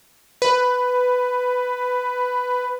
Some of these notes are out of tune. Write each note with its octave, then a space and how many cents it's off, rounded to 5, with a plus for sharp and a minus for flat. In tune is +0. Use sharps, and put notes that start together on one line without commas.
B4 +10